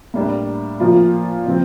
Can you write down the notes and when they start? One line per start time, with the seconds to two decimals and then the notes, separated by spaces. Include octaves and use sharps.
0.14 A2 G3 A#3 D4
0.80 A#2 F3 A#3 F4
1.46 A#2 F3 C4